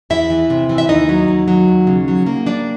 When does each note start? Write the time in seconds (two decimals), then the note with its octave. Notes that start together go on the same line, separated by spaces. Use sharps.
0.10 E2 E4 E5
0.30 E3
0.50 C3
0.69 E3
0.78 E5
0.89 D#2 D#4 D#5
1.09 F#3
1.28 D#2
1.48 F#3
1.68 D#2
1.87 C#3
2.08 F#3
2.26 A#3
2.46 G3 D4 D5